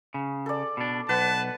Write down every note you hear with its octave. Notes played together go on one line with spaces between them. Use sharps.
C#3
A4 D5
B2 D4
B1 B4 F#5 A5